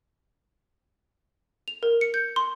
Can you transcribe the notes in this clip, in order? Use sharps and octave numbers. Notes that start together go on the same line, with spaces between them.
F7
A#4
C#7
G6
C6